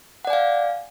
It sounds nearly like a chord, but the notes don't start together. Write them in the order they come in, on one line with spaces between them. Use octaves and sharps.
F#5 D5 G#5 F5